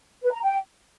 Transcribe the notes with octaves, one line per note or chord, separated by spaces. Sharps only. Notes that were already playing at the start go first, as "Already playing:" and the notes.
B4
A#5
G5